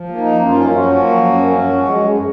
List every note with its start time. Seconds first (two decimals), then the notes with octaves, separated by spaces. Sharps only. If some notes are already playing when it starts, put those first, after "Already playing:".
Already playing: F3
0.09 A#3
0.17 D#4
0.32 F#2
0.45 F4
0.53 C#4
0.74 F3 F#3 F#4
0.95 A#3
1.16 F#2
1.38 C#4
1.59 F3
1.81 G#3
2.02 F#2